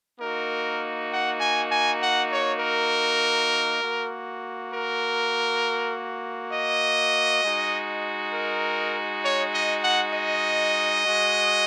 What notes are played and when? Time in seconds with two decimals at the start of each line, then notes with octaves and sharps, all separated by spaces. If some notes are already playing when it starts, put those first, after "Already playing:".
0.20 A#3 D#4 F#4 A#4
1.10 F#5
1.40 G#5
1.70 G#5
2.01 F#5
2.31 C#5
2.60 A#4
3.81 A#3 F#4
4.71 A#4
6.53 D#5
7.43 G#3 D#4 F#4
8.34 A#4
9.24 C#5
9.54 D#5
9.83 F#5
10.14 D#5
11.05 G#3 F#4